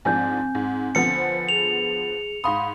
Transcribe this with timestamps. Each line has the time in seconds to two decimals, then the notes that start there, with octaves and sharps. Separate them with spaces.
0.05 G#2 F3 C4 D4 G#5 G6
0.55 G#2
0.95 D3 F3 B3 C#7
1.16 C5
1.49 G#4 F7
2.44 G#2 F5 B5 C6 D#6